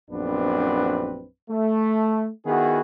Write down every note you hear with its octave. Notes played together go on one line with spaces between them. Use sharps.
A#1 F#2 B3 C4 D4 B4
A3
D#3 B3 E4 F#4 G#4